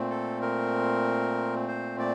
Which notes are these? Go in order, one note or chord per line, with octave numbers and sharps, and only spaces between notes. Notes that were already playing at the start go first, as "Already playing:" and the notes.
Already playing: A#2 A3 C4
A4
A#4
C5
D5